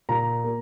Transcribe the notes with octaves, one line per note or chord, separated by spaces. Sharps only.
A#2 A#5
A#3